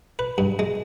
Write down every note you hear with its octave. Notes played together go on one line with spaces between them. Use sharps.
B4
G2
G#3